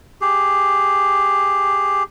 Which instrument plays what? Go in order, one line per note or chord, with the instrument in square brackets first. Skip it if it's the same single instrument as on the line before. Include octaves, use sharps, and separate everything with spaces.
[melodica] G4 G#4